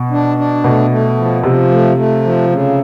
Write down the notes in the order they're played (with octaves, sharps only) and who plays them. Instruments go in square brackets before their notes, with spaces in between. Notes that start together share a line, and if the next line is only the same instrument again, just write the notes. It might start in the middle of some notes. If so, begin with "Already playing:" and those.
Already playing: [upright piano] B2
[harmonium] D4
D4
[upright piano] B2 [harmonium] A3
[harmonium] A3
F3
[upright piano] C3 [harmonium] F3
[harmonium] A3
A3
F3
C#3